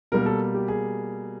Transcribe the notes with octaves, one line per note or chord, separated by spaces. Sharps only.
B2 G3 A#3 A#4
A4
G4
G#4